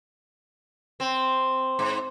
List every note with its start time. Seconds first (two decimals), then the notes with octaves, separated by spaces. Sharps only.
1.00 C4
1.79 G#2